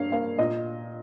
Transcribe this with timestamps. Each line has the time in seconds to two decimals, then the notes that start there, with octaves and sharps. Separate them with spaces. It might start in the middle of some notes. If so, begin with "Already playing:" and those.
Already playing: G2 A#3 C#5 F5
0.12 A#3 F5
0.39 A#2 D#5